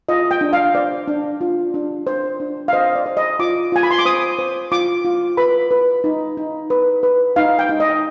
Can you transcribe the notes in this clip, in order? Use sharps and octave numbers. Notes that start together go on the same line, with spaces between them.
F4 D#5
G5
D4
F5
C5 D5
D4
F4
D4
C5
D4
F5
C5 D#5
D5
C5
D#5
F4 D6
F4 G#5
B5
C6
D6
C5 D#6
C5
F4 D6
F4
B4 B5
B4
D#4
D#4
B4
B4
D#4 F5
G5
D#4
D#5